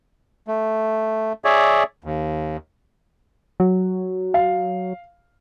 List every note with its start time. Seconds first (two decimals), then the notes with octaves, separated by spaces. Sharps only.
0.48 A3
1.45 G#4 C#5 D5 E5
2.04 D#2
3.60 F#3
4.34 F5